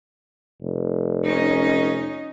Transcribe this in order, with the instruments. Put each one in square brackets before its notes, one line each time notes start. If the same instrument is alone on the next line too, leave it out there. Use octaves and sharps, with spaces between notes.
[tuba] F1
[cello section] C#4 D#4 D#5